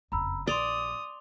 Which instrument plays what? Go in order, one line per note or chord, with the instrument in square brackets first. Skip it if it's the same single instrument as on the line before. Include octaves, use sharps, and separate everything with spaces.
[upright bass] F#1 F2 [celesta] A#5 B5 E6
[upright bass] A#1 [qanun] D5 [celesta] C6 F7 G7 [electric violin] D#6